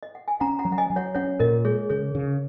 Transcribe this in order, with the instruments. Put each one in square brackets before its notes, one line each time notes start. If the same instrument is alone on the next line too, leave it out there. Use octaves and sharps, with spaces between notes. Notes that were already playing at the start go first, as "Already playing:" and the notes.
[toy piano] D#5
F#5
G#5
[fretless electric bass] C#4 [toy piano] F#5 A#5
[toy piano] F#5 A#5
[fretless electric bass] F#3
[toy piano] F#5
D#5 G#5
[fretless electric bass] F#3
[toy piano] C#5 F#5
[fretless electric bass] C#4 [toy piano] C#5 F#5
[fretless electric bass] A#2 [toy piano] A#4 D#5
[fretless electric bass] G#3 [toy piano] G#4 C#5
[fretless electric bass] C#3 [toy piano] G#4 C#5
[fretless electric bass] C#3